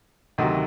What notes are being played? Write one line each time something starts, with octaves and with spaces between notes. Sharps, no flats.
D2 C3 D#3 F#3